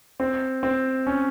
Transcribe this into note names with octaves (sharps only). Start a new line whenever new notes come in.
C4
C4
C#4